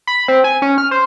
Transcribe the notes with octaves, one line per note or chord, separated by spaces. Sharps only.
B5
C4
G#5
C#4
F6
C5